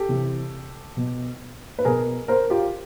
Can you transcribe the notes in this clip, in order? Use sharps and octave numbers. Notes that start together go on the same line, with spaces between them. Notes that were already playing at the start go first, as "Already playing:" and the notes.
Already playing: G4 A4
C3 E3
B2
B4
B2 G#4 A#4
A#4 C5
F4 G4